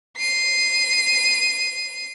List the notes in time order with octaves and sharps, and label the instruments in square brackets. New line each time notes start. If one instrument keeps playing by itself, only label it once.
[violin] C7 D#7